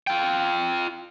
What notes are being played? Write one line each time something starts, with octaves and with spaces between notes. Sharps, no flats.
F4 G5